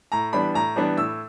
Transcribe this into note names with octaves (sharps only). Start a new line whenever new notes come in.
A2 A#5
E3 G3 B3 D4 B5
A2 A#5
E3 G3 B3 D4
A2 E6